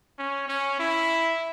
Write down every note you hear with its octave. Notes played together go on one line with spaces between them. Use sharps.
C#4
C#4
E4